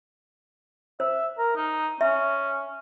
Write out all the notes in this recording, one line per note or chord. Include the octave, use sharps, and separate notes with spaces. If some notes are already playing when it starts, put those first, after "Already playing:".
C5 E5
A#4
D#4
C#4 E5